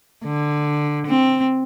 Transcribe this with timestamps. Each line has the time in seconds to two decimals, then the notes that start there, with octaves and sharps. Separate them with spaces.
0.24 D3
1.07 C4